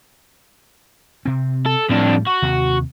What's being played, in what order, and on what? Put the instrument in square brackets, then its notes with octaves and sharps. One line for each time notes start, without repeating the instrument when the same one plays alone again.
[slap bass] C3 C4
[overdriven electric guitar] A4
[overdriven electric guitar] F2 D4 [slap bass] A2 G3
[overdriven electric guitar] F#4
[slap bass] D#2 C3